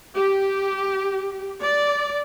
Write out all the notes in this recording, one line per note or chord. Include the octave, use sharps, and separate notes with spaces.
G4
D5